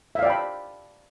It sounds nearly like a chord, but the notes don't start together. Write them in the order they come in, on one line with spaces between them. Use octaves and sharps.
E5 F5 D5 G5 B5